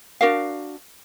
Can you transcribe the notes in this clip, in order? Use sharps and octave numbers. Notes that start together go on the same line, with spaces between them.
D4 F#4 A#4 F5